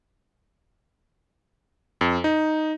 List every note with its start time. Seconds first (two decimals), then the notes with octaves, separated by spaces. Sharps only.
2.01 F2
2.24 D#4